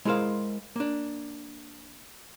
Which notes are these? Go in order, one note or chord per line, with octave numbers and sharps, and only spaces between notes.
G#3 E4 G#4 A#4 C5 F5
A#3 D4